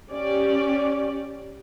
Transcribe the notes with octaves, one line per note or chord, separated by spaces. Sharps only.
C#4 G4 D5